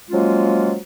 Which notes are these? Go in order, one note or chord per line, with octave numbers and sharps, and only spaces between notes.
F3 F#3 G#3 A#3 C#4 F4